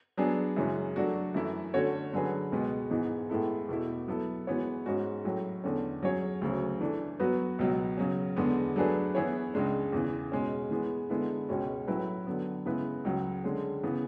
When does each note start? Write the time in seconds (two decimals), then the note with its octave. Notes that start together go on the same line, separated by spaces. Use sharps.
0.17 F#3 B3 D4 G#4
0.56 F#2 C#3 E3 G#3 C#4
0.96 F#3 A3 D4 F#4
1.34 F#2 E3 A3 E4
1.74 D3 A3 C#4 F#4 C#5
2.13 D3 F#3 C#4 G#4 B4
2.52 C#2 B2 G#3 B3
2.90 G#2 E3 G#3 B3
3.29 A2 G#3 B3 E4 A4
3.69 E2 B2 A3 E4
4.07 F#3 B3 E4 A4
4.47 E3 G#3 B3 F#4 C#5
4.86 G#2 G#3 C#4 F#4
5.25 A2 F#3 C#4
5.64 E2 D3 A3 C#4
6.03 F#3 C#4 G#4 C#5
6.41 D2 C#3 F#3
6.81 E3 A3 D4
7.20 F#3 B3 F#4 B4
7.59 C#2 B2 F#3
7.98 C#3 F#3 C#4
8.37 E2 D3 G#3 B3
8.76 F#3 A3 D4 G#4 B4
9.15 E3 B3 E4 G#4 C#5
9.54 C#2 C#3 G#3 D4
9.93 E2 C#3 E3
10.32 B2 G#3 C#4
10.71 E3 G#3 B3
11.10 D3 G#3 B3 E4
11.49 C#2 B2 G#3 C#4 F#4
11.88 A2 F#3 C#4 E4 B4
12.27 D3 F#3 B3
12.66 C#3 G#3 B3 E4 B4
13.05 C#2 C#3 F#3
13.44 D3 G#3 C#4 G#4
13.83 C#3 E3 B3